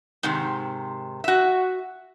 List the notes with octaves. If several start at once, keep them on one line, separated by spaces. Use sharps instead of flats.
G#2 C3 D#3
F#4 E5